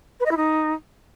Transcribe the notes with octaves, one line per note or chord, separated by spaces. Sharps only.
B4
D#5
E4
D#4